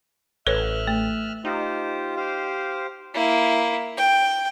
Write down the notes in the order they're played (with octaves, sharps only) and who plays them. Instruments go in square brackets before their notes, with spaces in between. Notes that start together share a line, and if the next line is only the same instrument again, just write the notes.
[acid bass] A1 [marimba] A4 B4 C#5 [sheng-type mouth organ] E5 F6 F#6
[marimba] A3
[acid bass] D#4 [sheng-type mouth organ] F4 G4 C5
[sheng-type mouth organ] G4 C5 F5
[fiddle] A#3 E4
G5